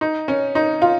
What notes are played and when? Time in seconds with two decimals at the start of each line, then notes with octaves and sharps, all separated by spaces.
0.01 D#4
0.28 C#4
0.55 D#4
0.82 F4